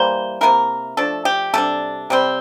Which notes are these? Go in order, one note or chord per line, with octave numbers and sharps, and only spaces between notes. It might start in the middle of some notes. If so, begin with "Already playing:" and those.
Already playing: E3 G3 A#3 C5
C3 F3 A#3 E4 A#4
F3 A3 D4 A4
G4
C3 G3 D4 A4
C3 G3 C4